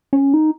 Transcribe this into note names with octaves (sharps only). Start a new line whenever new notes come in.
C#4
D#4